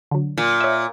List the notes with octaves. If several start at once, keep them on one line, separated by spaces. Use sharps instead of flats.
D3 F#3
A#2
C#5 E5